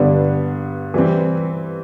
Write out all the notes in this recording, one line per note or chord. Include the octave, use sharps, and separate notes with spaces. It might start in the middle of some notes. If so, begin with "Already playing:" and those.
Already playing: G2 D3 G3 B3 D4
E3 G3 C4